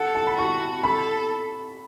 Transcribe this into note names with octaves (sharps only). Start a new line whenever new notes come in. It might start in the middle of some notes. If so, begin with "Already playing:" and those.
Already playing: A4 F#5
A5
B5
F#4 C#6
A4 B5